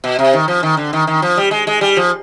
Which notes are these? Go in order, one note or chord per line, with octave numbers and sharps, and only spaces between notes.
B2
C3
D#3
F3
D#3
D3
D#3
D#3
F3
G3
G#3
G#3
G3
F3